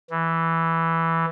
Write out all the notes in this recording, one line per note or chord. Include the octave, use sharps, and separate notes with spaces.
E3